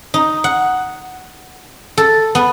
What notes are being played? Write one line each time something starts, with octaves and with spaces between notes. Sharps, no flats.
D#4
F#5
A4
B3